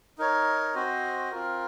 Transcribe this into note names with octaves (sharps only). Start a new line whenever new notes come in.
D#4 A#4 C#5
C4 F#4 C5 D#5
C4 F4 A#4